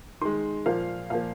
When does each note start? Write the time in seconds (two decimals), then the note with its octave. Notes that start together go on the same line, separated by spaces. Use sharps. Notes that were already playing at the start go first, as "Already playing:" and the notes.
0.22 D#3 G#3 C6
0.66 A#2 F3 A#3 F5
1.10 A#2 F3 A#3 F5